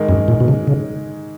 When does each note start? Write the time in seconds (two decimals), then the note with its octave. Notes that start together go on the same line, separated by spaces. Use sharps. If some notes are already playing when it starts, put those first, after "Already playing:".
Already playing: G#2 D#3 G#3
0.09 F#2
0.28 A#2
0.40 B2
0.48 C#3
0.67 C#3